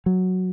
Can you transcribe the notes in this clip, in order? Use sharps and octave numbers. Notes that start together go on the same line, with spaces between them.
F#3